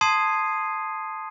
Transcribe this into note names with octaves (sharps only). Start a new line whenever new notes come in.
A5 C6 D#6 G#6 C7 D#7